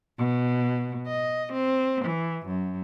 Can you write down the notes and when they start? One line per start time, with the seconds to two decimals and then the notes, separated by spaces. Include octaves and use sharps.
0.18 B2
1.07 D#5
1.53 C4
2.05 E3
2.46 F#2